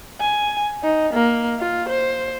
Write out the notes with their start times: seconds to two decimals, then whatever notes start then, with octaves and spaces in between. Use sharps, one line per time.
0.20 G#5
0.83 D#4
1.14 A#3
1.59 F4
1.89 C5